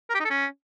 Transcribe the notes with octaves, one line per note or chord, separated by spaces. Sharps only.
A#4
G4
D#4
A4
C#4